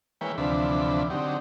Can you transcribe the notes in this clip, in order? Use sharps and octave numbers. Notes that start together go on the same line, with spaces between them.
E3 G#3 A#3 B4 C#5 G5
D2 C3 E3 F3 D4 B5
D3 F#3 C4 D#4 G4